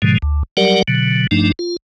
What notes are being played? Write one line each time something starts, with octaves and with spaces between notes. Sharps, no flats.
G#2 B2 D3 F3 G#3
D2
F#3 G3 G4 A#4 D5 F#5
B2 D3 F#3
G2 F3 A3 D4 D#4
F4